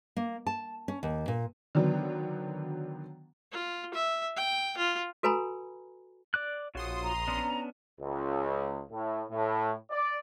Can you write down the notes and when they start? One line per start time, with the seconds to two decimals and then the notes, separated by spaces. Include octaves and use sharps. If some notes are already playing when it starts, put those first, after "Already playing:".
0.17 A#3
0.47 A5
0.88 C#4
1.03 D#2
1.28 A#2
1.75 D3 D#3 F#3 B3 D4
3.52 F4
3.94 E5
4.36 G5
4.77 F4
5.23 F#4 A4 B4 G#5 A#5 B5
6.34 D5 D6 F#6
6.75 A#1 F4 F#4 C#5 C6 D#6
7.03 A#5
7.28 B3 C#4 D4
8.01 C#2
8.91 A2
9.31 A2
9.91 D5